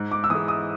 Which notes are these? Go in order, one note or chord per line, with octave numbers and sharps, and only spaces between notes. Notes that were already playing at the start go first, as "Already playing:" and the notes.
Already playing: G#2
D6
E6
E3 G#3 D#6
D#6